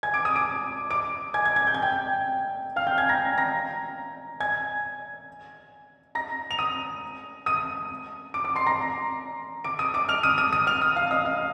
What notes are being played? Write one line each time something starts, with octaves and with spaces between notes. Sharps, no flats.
G#5 G#6
D6 D7
D#6 D#7
D6 D7
D6 D7
G#5 G#6
G#5 G#6
G#5 G#6
G6
G#6
G5 G6
F5 F6
G5 G6
G#5 G#6
A#5 A#6
A#5 A#6
G#5 G#6
A#5 A#6
F7
D#6 D#7
D#6 D#7
D6 D7
D6 D7
C6 C7
A#5 A#6
D6 D7
D#6 D#7
D6 D7
F6 F7
D#6 D#7
D#6 D#7
D#6 D#7
F6 F7
D#6 D#7
F5 F6
D#5 D#6
F5 F6